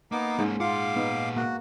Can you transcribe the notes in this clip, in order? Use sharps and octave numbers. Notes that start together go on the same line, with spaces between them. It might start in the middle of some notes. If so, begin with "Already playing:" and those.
A#3 B3 D#4 D6
G#2 A#3 C#4
A#2 F4 F5 F#5 D6
B3 D#4
A#3 F#4